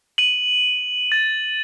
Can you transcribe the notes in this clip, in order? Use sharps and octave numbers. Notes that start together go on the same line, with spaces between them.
D#7 F#7
A6